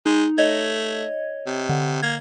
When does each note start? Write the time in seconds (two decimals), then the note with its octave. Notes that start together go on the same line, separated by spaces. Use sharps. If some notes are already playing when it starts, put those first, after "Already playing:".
0.06 G#3 D#4
0.38 A3 C#5 D#5 G#6
1.46 C3
1.69 D3
2.02 A#3 G#6